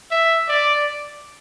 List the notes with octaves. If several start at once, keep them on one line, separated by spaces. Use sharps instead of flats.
E5
D5